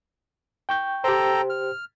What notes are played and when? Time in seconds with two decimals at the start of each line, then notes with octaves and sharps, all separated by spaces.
0.69 G5 C#6 G6
1.04 G4 A4 C5 G5 A#5
1.50 F6